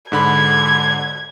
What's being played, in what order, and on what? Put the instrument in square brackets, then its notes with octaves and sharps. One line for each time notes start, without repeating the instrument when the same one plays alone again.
[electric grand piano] G#2 D3 B5 [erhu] G#6